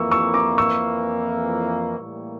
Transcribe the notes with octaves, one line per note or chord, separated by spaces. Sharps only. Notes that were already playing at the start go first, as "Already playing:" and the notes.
Already playing: F2 E3 A#3 C#6 E6
C#6 E6
A#5 D6
C#6 E6
A2 E3 G3 A#3